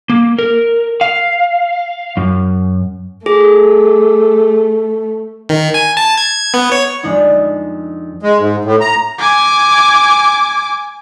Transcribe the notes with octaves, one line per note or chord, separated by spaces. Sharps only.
A#3
A#4
F5
F#2
A3 G#4
D#3
G#5
A5
G#6
B3
C#5
F2 G#3 D4 D#4
G#3
G#2
A2
A#5
G#5 D6